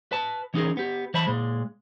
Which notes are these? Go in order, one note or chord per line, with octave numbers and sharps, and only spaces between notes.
B4 A5
E3 C#4 D#4 F#4 G#4 A#4
B3 G4
E3 C5 E5 A5 B5
A#2 G#3